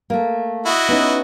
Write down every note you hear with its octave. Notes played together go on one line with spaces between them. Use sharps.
A3 A#3
E4 F#4 D#5
B3 C#4 D#4